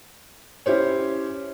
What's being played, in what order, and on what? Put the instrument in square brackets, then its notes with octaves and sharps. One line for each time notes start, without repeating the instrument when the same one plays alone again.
[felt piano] C#4 E4 G4 C5 C#5